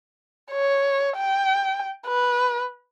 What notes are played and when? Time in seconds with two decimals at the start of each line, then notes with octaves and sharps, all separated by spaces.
0.51 C#5
1.17 G5
2.07 B4